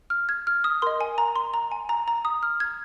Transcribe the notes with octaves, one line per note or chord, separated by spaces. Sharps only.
F6
G#6
F6
D#6
A#4 D#5 C6
G#5
A#5
C6
A#5
G#5
A#5
A#5
D#6
F6
G#6